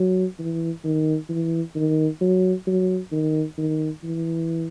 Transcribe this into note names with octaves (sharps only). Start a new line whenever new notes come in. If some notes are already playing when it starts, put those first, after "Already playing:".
Already playing: F#3
E3
D#3
E3
D#3
F#3
F#3
D#3
D#3
E3